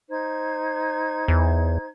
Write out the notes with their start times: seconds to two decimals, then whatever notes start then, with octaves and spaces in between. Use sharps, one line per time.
0.10 D#4 C5 G#6
1.28 E2